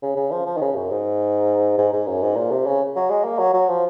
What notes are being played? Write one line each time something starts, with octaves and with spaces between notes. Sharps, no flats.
C#3
C#3
F3
F3
D#3
C#3
F#2
G#2
G#2
G#2
F#2
G#2
A#2
C3
C#3
F#3
G#3
A#3
F#3
F#3
F3